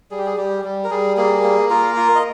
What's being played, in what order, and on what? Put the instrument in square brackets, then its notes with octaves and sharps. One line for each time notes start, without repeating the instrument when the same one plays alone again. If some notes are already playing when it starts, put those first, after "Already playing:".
[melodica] G3 G#4
G4
G#4
G3 G4
G3
A#4
G3 G#4
A#3 G#4
A#3
F4 A#4
F4
D#5